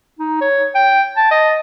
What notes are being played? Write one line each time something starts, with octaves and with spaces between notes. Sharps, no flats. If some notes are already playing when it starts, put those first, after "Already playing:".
D#4
C#5
G5
A5
D#5